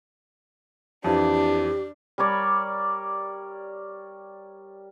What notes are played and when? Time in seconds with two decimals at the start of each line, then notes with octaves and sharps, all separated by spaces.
1.04 F2 E3 D4 G4
2.18 G3 A#4 C#5 D5